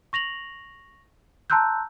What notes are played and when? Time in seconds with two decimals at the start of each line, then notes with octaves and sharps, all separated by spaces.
0.13 C#6 A#6 F7 F#7
1.50 A5 A#5 C6 E6 F#6 G6